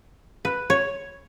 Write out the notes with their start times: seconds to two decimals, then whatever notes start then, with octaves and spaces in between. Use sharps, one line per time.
0.45 B4
0.70 C#5